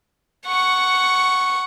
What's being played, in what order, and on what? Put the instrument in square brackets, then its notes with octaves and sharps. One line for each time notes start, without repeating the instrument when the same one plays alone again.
[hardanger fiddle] F#5 C#6